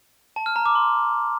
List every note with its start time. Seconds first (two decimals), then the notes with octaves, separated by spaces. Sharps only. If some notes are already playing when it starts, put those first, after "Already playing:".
0.36 A5
0.46 F6
0.56 A#5
0.66 D6
0.75 C6